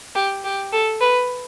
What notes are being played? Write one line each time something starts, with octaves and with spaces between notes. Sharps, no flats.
G4
G4
A4
B4